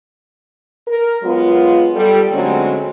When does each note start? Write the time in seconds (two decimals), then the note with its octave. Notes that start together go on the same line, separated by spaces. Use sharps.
0.88 A#4
1.23 F#3 G#3 B3 F4
1.96 G3 A4
2.32 D3 F#3 G#3 A3 C4 C#4